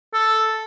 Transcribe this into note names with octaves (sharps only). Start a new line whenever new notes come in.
A4